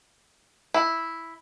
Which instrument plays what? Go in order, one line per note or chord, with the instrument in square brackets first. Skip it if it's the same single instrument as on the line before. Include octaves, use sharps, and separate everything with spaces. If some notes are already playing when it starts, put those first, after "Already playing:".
[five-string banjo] E4